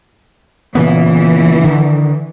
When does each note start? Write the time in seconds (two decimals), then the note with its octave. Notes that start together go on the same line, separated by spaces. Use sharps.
0.75 A#2 C#3 E3 B3
1.64 D3 D#3